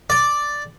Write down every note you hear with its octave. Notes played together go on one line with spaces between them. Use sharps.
D5